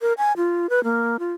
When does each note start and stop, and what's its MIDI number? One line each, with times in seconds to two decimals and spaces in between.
0.01 0.13 70
0.18 0.33 80
0.37 0.69 65
0.70 0.83 71
0.84 1.17 58
1.19 1.33 65